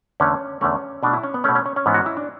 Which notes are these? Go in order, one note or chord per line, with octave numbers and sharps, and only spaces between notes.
E2 D3 A3 C#4
E2 D3 A3 C#4
B2 A3 D4
E4
C#4
B3
B2 A3 C#4
C#4
C#4
C#4
G#2 E3 B3
F#4
E4
D4